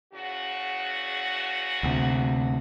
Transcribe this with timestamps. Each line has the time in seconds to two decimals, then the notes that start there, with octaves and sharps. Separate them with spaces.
0.12 E2 C#3 F#4
1.83 D2 C3